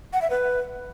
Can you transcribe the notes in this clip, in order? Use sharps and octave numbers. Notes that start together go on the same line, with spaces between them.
F#5
E5
B4